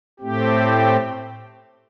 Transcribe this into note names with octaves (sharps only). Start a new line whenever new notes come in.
A2 A3 C4 G4